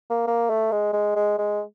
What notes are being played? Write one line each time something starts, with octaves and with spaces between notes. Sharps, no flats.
A#3
A#3
A3
G#3
G#3
G#3
G#3